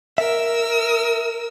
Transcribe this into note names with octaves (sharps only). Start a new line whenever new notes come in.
A#4 E5 E6